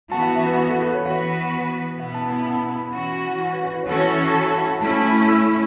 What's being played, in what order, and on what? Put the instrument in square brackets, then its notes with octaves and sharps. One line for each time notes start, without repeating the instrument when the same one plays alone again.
[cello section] E3 B3 F#4 [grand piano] A5
[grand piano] F#5
E5
B4
B4
A4
B4
C#5
[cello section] E3 B3 F#4 B4 [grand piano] F#5
[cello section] B2 B3 E4 [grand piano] F#5
[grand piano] A5
B5
A5
B5
[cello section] E3 C#4 F#4
[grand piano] C#6
B4
B4
B4
C#5
[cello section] E3 C#4 F#4 A4 [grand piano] B4
[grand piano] C#5
E5
A5
B5
A5
F#5
F#5
[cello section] A3 C#4 E4 [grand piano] A5
[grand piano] A5
B5
C#6
E6